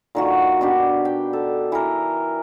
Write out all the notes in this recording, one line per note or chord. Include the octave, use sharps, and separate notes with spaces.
A#2 D#3 F#4
B2 D4 G4
G5
A4
E3 A#4